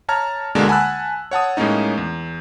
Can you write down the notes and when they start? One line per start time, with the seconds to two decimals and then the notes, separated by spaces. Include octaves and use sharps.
0.09 C#5 A5 A#5 F6 G#6
0.55 D2 B2 D3 G#3 A#3 D4
0.68 F#5 G#5 A5 B5 E6 F#6
1.31 C#5 F#5 A5 D#6
1.57 A2 G#3 A#3 C#4 D#4
1.97 E2